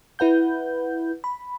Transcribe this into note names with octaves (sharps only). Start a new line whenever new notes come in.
E4 B4 F#5 G6
B5